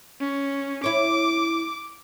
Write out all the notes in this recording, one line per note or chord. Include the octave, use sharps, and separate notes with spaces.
C#4
E4 C#5 D6